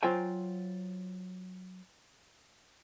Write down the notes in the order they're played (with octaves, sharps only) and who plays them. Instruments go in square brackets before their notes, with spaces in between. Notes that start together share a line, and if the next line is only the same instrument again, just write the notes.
[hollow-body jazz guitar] F#3 F4 C5 G5 G#5